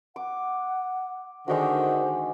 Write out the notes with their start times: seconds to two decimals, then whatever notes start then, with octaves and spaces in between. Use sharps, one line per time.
0.16 F#5 D6
1.48 D3 D#3 G#3 D4 F#4 C5